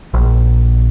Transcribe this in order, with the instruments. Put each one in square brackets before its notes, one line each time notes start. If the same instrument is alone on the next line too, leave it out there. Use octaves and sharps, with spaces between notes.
[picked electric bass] A#1